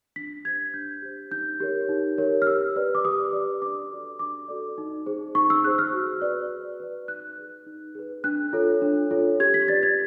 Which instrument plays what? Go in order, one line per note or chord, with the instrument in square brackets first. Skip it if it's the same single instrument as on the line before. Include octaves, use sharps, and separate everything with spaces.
[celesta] D4 B6
G4 C5 G#6
D4 G6
G4 C5
D#4 G6
G4 A#4 C#5
D#4
G4 A#4 C#5
F6
G4 E6
B4 D5
D6
G4 D#6
B4 D5
D4 D6
F#4 A4 D5
D4 D6
F#4 A4 D5
D#4
G#4 C5
D#4 C#6
E6
G#4 C5 F#6
F6
F#4
B4 D5
F#4
B4 D5
D#4 F#6
G#4 B4
D#4
G#4 B4
D4 F#6
F4 A4 C#5
D4
F4 A4 C#5
G4 G#6
B6
B4 D5 A6
G#6